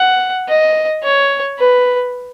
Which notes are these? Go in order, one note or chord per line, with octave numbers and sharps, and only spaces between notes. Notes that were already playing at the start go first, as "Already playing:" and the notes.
Already playing: F#5
D#5
C#5
B4